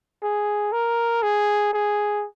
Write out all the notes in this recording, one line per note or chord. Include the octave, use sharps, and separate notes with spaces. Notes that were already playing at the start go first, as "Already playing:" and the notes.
G#4
A#4
G#4
G#4